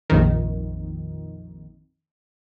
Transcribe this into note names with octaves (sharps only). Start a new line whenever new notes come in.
A#1 F2 D#3